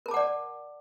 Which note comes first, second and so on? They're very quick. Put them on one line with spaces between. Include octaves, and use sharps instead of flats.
A#4 A5 D6 F#5 D5